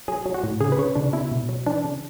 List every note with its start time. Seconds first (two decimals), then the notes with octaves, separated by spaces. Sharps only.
0.08 F#3 G#4
0.26 F#3
0.34 F#4
0.43 A2
0.61 C#3 G#4
0.72 B4
0.78 C#3 C#5
0.95 C#3 D4
1.13 B2 E4
1.31 B2
1.49 F#3
1.66 E3 D4
1.85 C#3